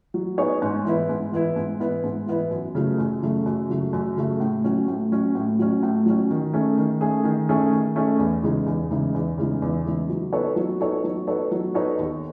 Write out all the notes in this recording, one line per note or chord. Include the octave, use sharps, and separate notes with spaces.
F#3
B3 D#4 G#4 C#5
G#2
E3 B3 E4
G#2
E3 B3 E4
G#2
E3 B3 E4
G#2
E3 B3 E4
F#2
C#3 F#3 A3
F#2
C#3 F#3 A3
F#2
C#3 F#3 A3
F#2
C#3 F#3 A3
A2
F#3 C#4
A2
F#3 C#4
A2
F#3 C#4
A2
F#3 C#4
D#3
A3 C#4 G#4
D#3
A3 C#4 G#4
D#3
A3 C#4 G#4
D#3
A3 C#4 G#4
E2
C#3 E3 G#3 D#4
E2
C#3 E3 G#3 D#4
E2
C#3 E3 G#3 D#4
E2
C#3 E3 G#3 D#4
F#3
B3 D#4 A4 C#5
F#3
B3 D#4 A4 C#5
F#3
B3 D#4 A4 C#5
F#3
B3 D#4 A4 C#5
D#2